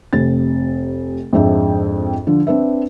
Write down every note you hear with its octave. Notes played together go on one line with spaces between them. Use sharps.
F1 C3 A6
F2 G#2 D4 E5 G5
D3 F3
C4 D4 B4 E5